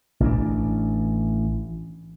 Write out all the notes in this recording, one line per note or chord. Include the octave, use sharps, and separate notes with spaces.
A1 E3 D4